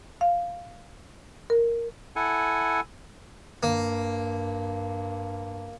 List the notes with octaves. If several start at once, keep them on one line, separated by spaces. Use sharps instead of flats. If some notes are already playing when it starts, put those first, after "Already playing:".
F5
A#4
E4 A4 F#5 G#5
G2 A#3